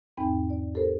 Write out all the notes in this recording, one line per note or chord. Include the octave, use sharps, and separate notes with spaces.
E2 G#2 C4 D#4 G5 B5
D5
G4 A4 A#4 C5